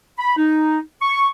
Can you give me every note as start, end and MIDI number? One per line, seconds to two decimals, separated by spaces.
0.19 0.36 83
0.37 0.79 63
1.02 1.27 85